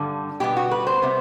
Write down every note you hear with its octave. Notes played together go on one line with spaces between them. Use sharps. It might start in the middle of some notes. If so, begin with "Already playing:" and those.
Already playing: G2 D3 G3
B2 G3 B3 G4
F#4
B4
C5
C3 G3 B3